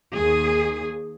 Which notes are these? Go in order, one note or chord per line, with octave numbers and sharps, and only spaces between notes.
D#2 G#4